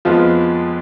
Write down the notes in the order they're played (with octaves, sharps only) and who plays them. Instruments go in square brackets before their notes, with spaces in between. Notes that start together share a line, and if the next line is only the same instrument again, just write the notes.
[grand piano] F2 F3 G#3 B3 F4